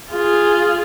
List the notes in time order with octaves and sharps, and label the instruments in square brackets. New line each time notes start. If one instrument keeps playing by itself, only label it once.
[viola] F4 G#4